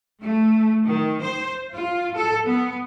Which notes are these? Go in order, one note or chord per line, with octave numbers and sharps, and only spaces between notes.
A3
D#3
C5
F4
A4
B3